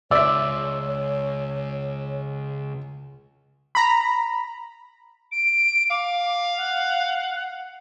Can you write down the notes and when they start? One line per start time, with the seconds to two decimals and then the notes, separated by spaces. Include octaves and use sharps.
0.11 C#2 C#5 D5 E5 E6
3.75 A#5 B5
5.32 D7
5.90 F5 D6
6.57 F#5